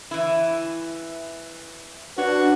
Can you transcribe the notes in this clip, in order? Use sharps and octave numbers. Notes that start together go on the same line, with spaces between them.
E3 E4
D4 F#4 B4 C#5